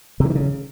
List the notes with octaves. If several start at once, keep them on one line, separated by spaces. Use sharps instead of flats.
C3
E3
D#3
C#3